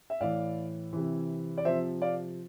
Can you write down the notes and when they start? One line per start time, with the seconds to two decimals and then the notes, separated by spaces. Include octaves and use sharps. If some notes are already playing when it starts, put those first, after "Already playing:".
0.10 E5
0.20 A2 E3 D5 F5
0.93 C3 E3
1.58 D5
1.65 C3 F3 C5 E5
2.02 D5 F5